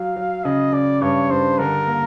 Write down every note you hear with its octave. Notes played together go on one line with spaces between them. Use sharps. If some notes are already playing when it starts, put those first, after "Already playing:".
Already playing: F#3 F5
F#3
C#3 D#5
C#3 D5
G2 C#5
G2 C5
D3 A#4
A#3